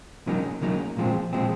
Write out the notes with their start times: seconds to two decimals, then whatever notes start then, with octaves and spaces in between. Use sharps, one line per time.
0.26 C#2 C#3 F#3 A#3 D#4
0.62 C#2 C#3 F#3 A#3 D#4
0.97 A#2 F3 G#3 C4
1.33 A#2 F3 G#3 C4